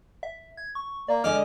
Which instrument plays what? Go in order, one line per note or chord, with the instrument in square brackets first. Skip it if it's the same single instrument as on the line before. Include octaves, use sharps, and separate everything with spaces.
[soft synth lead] E5
G#6
C#6
[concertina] A#3 [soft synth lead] D5
[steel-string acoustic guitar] D3 G#3 D#5 [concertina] D6 F6